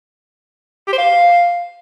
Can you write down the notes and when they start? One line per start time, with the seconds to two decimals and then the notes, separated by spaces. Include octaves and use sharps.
0.88 G4
0.93 C5
0.98 F5